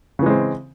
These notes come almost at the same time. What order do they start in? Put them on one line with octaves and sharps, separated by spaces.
C#3 E3 G#3 C4